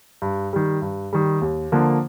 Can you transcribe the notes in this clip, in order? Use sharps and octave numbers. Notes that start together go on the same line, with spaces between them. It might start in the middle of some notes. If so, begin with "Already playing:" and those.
G2
D#3 G3
G2
D#3 G3
D#2
D3 F3 A#3